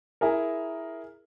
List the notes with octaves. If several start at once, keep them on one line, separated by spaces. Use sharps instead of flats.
E4 G#4 A#4